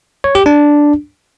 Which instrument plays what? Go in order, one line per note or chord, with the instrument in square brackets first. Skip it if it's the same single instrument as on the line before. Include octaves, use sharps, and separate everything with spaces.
[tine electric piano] C#5
G4
D4